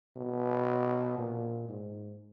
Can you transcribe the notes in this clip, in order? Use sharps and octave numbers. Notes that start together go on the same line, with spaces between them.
B2
A#2
G#2